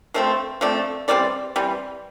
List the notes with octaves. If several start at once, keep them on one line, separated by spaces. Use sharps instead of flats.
F3 A3 C4 C5
F3 A3 C4 D5
E3 G3 C4 D5
E3 G3 C4